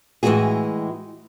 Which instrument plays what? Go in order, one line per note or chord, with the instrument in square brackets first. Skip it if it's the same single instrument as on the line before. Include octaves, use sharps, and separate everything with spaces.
[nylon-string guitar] A2 E3 F3 G#3 F#4 G#4